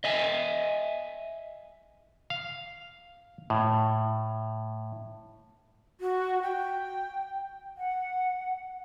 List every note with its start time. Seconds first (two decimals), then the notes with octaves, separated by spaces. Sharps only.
0.04 D#5 E5 G#5
2.30 F5
3.50 A2
6.01 F#4
6.42 G5
7.78 F#5